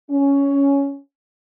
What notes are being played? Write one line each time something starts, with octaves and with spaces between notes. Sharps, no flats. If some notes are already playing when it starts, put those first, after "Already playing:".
C#4